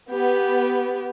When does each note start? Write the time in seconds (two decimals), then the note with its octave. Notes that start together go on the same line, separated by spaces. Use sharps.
0.10 B3 G4